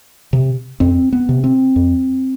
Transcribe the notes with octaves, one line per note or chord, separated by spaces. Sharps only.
C3
F2 C4
B3
C3
C4
F2